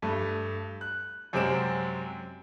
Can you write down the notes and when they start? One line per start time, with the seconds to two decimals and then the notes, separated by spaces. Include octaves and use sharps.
0.02 G2 A3
0.81 F#6
1.33 F#2 C3 G#3 C4 D7 E7